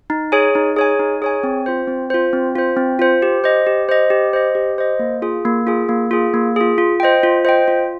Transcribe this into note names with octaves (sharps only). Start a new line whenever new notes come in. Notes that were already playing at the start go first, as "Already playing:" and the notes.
D#4
G#4 C#5 G#5
D#4
G#4 C#5 G#5
D#4
G#4 C#5 G#5
C4
F4 C5
C4
F4 C5
C4
F4 C5
C4
F4 C5
G4
C5 D#5
G4
C5 D#5
G4
C5 D#5
G4
C5 D#5
A#3
F4 G#4
A#3
F4 G#4
A#3
F4 G#4
A#3
F4 G#4
F4
C5 D#5 G5
F4
C5 D#5 G5
F4